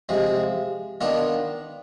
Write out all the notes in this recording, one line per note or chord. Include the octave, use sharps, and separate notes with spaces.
C3 F3 G#3
D#3 B3 D4 F4